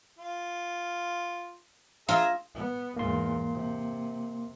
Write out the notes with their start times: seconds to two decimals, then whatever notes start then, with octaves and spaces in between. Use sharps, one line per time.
0.18 F4
2.09 F4 G#4 E5 A#5
2.55 B3
2.96 E2 G#2 A#3 C6
3.54 C3